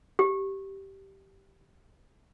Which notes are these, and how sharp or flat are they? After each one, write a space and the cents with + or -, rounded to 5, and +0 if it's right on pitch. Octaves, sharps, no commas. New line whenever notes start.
G4 -10